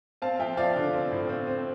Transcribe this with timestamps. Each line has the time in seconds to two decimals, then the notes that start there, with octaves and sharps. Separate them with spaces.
0.22 C4 F5 A5
0.39 F3 E5 G5
0.57 F3 D5 F5
0.76 D3
0.93 C4
1.11 A2
1.29 C4
1.47 C4